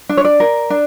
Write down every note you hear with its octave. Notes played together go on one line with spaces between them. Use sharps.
D4
C#5
D5
A#4
D4